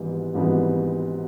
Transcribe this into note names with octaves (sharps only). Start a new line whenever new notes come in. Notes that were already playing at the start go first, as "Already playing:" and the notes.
Already playing: G#1 G#2 E3 G3 B3
G#1 G#2 E3 G3 B3